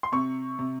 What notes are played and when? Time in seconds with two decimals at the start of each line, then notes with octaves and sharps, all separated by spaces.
0.03 C6
0.12 C3 C#6
0.59 C3